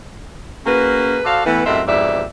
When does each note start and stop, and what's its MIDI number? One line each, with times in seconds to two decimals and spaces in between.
0.66 1.19 58
0.66 1.19 61
0.66 1.19 66
0.66 1.19 68
0.66 1.19 71
1.25 1.44 66
1.25 1.44 69
1.25 1.44 72
1.25 1.44 74
1.25 1.44 77
1.45 1.65 52
1.45 1.65 57
1.45 1.65 59
1.66 1.82 42
1.66 1.82 45
1.66 1.82 55
1.66 1.82 60
1.66 1.82 75
1.66 1.82 76
1.86 2.23 41
1.86 2.23 44
1.86 2.23 47
1.86 2.23 67
1.86 2.23 74
1.86 2.23 76